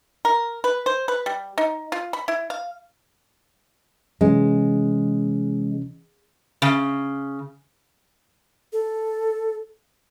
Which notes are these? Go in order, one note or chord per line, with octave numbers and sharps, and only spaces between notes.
A#4
B4
C5
B4
G3
D#4
F4
B5
E4
F5
C3 E3 G#3 C#4
C#3
A4